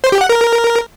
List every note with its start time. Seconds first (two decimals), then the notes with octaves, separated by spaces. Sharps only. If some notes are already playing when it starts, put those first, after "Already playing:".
0.04 C5
0.12 G4
0.21 F#5
0.29 A#4